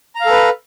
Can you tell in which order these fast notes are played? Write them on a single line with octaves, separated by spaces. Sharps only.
A#5 F5 A4 B4